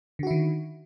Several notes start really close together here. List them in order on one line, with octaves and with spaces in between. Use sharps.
D3 F#4 E4 D#3